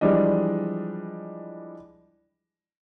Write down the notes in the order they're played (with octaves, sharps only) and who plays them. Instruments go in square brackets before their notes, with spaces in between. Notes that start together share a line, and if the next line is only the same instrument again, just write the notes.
[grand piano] E3 F3 G3 G#3 D4 D#5